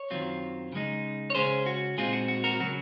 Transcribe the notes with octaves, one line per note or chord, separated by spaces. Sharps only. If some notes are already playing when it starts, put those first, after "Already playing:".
Already playing: C#5
F#2 D#3 F#3 C4 F4
C#3 G#3 D#4
C#5
C#3 G#3 C#4 G#4 C5
F#4
A#2 G#3 C4 D#4 F4 G#4
F#4
F#4
F#4 A#4
C#3 F#3 F#4